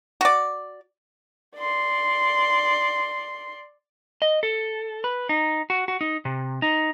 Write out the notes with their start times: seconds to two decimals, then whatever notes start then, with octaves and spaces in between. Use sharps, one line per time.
0.21 F#4 D5
1.56 D5 C6
4.22 D#5
4.43 A4
5.04 B4
5.29 D#4
5.70 F#4
5.88 F#4
6.01 D#4
6.25 C3
6.62 D#4